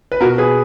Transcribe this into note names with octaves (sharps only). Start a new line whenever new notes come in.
B4
B2 F#4 A#4
G#4 B4